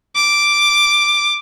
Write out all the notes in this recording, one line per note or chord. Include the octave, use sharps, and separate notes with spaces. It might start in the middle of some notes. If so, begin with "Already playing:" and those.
D6